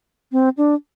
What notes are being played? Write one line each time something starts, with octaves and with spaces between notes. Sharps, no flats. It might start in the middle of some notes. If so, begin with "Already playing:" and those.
C4
D4